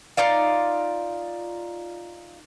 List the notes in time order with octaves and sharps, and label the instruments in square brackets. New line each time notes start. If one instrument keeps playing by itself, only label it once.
[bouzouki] D#4 F4 D5 F5